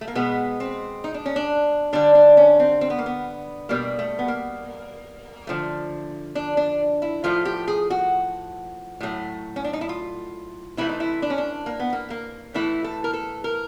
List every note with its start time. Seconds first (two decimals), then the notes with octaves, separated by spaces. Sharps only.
0.01 A3
0.08 A#3
0.15 B2 G#3 B3
0.60 C4
1.04 D#4
1.14 D4
1.26 C#4
1.36 D4
1.93 D3 G3 D4
2.15 D4
2.37 C#4
2.60 C4
2.81 C4
2.90 B3
2.99 A#3
3.06 B3
3.69 B2 G3 A#3
3.99 A3
4.19 B3
4.28 A#3
5.47 D3 F3 A3
6.35 D4
6.57 D4
7.02 E4
7.24 A2 F3 A3 F4
7.45 G4
7.68 G#4
7.90 F#4
9.01 A2 F#3 A3
9.56 C#4
9.64 D4
9.73 D#4
9.81 E4
9.89 F4
10.77 C3 E3 A3 E4
10.89 D#4
11.00 E4
11.22 D4
11.30 C#4
11.38 D4
11.66 A#3
11.80 B3
11.93 A#3
12.10 A#3
12.54 A2 E3 A3 E4
12.84 A4
13.04 A#4
13.13 A4
13.44 A#4